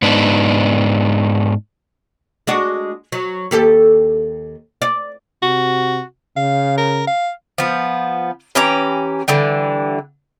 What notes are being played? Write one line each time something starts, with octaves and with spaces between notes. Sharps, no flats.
G#2 B3 D4 D#4
G#3 D4 F#4
F#3
D#2 G4 A4
D5
C3 F#4
C#3 F5
A#4
F5
F3 B3
E3 C#4 G4 A#5
D3 E3 G3